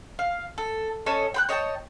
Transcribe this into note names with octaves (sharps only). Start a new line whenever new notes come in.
F5
A4
C#4 A4 C#5 D#5
G5 B5 F#6
C#5 D#5 G5 A5